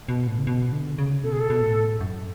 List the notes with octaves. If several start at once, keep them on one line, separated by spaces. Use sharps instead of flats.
B2
A2
C#3
B2
D3
C#3
B2 A4
G#4
A4
B2
A2
F#2